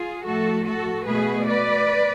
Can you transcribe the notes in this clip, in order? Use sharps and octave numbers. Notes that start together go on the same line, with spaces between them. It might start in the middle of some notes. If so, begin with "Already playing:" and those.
Already playing: F4 G#4
A2 F3 A3 F#4 A4
F#4 A4
B2 A3 G#4 B4
B4 D5